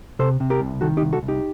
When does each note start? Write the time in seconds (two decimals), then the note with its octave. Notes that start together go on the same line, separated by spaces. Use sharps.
0.19 C3 A4 C5
0.40 C3
0.50 G4 A#4
0.61 C2
0.81 D#3 F#4 A4
0.97 D#4 G4
1.02 C2
1.13 F#4 A4
1.23 C2
1.28 D#4 G4